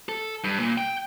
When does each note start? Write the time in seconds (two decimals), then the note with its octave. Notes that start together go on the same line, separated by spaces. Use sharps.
0.09 A4
0.44 G2
0.60 A#2
0.78 G5